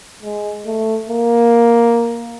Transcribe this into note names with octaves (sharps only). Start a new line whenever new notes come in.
G#3
A3
A#3